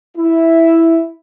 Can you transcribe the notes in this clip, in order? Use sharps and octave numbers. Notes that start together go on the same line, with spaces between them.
E4